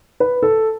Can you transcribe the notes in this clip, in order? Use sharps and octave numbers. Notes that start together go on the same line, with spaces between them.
B4
A4